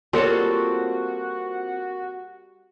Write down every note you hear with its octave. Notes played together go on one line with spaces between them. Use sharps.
G3 A#3 C4 F4 F#4 A4 C#5 C6